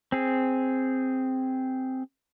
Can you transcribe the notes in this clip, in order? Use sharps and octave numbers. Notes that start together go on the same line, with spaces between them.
C4 G#4